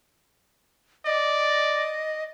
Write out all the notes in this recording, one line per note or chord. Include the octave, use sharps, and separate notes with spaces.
D5 D#5